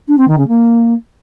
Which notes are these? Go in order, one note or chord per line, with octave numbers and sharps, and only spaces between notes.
D4
C4
D#3
C#3
A#3